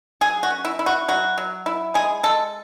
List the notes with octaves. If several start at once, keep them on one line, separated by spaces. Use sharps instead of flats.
F#3 G#4
F#4
C#4
E4
E4
F#4
F#3 F#4
F#3
E4
G#3 G#4
G#3 A4